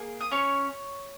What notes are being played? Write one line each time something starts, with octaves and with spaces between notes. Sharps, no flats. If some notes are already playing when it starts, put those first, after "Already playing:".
Already playing: A#3 G#4
D#6
C#4 C#5 C#6